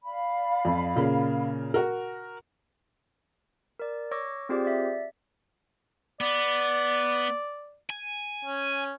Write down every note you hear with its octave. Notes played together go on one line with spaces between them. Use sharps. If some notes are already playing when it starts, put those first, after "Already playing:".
D5 F5 B5
F2
A#2 C#3 A#3
F#4 A#4
A#4 D5
C#5 C#6 D6 E6 A#6
C4 F4 G4 G#4 C5 D5
D5 E5
B3 D5
G#5
C#4